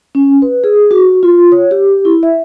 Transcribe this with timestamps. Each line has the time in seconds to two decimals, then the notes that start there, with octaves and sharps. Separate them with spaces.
0.15 C#4
0.42 B4
0.64 G#4
0.91 F#4
1.23 F4
1.52 C#5
1.71 G4
2.05 E4
2.23 E5